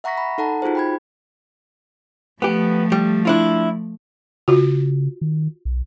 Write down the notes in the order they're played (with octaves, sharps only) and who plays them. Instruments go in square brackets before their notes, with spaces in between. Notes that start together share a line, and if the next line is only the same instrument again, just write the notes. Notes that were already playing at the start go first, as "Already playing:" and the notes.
[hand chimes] E5 F#5 A#5 C#6 A#6 B6
B5
D#4 A4 F#5 A5 A#5
D#4 F4 F#4 G#4 C5
G5 B5 G#6
[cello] F3 A3 [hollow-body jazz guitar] B3 G4
[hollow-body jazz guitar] G3
D4 E4 F4
[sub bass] C#3 [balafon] F4 F#4
[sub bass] D#3
B1